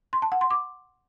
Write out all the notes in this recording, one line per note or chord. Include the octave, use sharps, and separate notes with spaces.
C6
A5
F#5
C6
D6